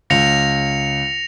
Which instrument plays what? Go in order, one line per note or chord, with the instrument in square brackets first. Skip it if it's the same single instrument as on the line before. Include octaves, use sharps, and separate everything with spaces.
[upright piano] C#2 [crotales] A#6 C#7 F7